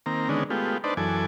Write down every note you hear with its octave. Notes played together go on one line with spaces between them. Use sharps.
D#3 A#3 C4 A#5
D3 D#3 G#3 B3 C#4 D4
G#3 A3 B3 F4 G4
D4 D#4 B4 C5 D5 A5
F#2 E3 A4 G#5 D6